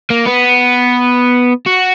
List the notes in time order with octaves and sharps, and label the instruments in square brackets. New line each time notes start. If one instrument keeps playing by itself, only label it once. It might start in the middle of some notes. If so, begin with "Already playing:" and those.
[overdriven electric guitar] A#3
B3
F#4